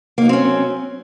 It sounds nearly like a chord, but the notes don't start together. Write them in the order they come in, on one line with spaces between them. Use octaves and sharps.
A#3 D#4 F#3 C4 C#4